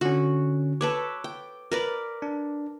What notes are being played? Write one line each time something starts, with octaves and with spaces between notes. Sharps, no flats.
D3 C#4 F#4
A4 B4 C#5 D6
G5
A#4 B4 D5
D4